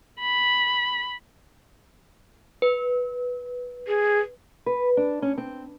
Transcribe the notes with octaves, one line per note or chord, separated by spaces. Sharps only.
B5
B4
G#4
B4
D4
C#4
C4